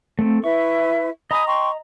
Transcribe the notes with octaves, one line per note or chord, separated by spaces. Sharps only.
A3 C4
E4 B4 E5 C#6
D#5 G#5 A#5 B5 D#6
G5 C6 C#6